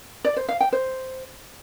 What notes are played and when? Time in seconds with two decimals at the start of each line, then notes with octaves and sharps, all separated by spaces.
0.25 D5
0.37 C5
0.49 F5
0.61 G5
0.73 C5